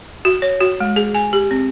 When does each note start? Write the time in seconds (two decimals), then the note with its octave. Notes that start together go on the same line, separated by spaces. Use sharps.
0.25 F#4
0.42 C#5
0.61 F#4
0.80 G#3
0.96 G#4
1.14 G#5
1.33 G4
1.51 C4